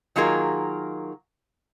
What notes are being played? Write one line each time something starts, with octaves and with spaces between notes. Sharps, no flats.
D#3 F#3 A#3 F4 G#4 A#4